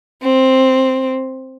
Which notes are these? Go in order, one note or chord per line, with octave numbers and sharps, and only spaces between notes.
C4